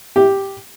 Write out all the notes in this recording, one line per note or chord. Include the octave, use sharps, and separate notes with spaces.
G4